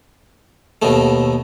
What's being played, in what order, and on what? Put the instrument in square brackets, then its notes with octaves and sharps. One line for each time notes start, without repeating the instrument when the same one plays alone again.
[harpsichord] D#2 B2 D#3 A3